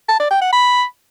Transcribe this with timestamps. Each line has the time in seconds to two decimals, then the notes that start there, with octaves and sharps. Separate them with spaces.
0.09 A5
0.20 D5
0.31 G5
0.42 F#5
0.53 B5